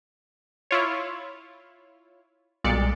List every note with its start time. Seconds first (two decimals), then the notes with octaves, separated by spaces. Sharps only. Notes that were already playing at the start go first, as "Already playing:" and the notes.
0.71 E4 F4 C#5
2.64 B1 A#2 G3 G#3 D5 C#7